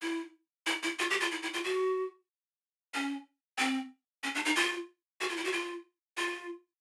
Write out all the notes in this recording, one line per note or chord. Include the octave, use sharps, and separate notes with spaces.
E4
E4
E4
F4
G4
F4
E4
E4
F4
F#4
C#4
C4
C#4
D4
D#4
F4
F#4
F4
E4
F#4
F4
F4